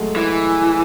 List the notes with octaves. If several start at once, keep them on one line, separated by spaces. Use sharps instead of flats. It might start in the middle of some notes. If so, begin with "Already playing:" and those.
Already playing: F#3 G#3 A3
E3